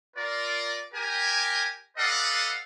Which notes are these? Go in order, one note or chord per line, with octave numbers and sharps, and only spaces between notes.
F4 A#4 D5
G4 A#4 G#5
A4 B4 D5 D#5 F5 F#5